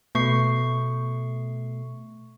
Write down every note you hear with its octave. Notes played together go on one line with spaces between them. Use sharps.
B2 A3 C#6 C7